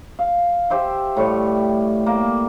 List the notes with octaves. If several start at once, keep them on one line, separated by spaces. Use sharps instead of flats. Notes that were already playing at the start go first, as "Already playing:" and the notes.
F5
G4 C5 E5
A2 G3 C#6
A#3